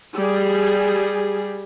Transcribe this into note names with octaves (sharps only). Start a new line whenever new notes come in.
G3 G#4